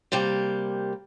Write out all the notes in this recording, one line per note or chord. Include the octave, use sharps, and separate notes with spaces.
C3 G3 A#3 G4